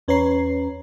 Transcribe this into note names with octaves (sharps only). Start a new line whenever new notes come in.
E2 C#4 B4 C#5 A#5 C7